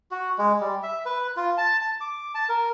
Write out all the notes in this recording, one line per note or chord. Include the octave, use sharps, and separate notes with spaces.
F#4
G#3
G3
E5
B4
F4
A5
A5
D6
A5
A#4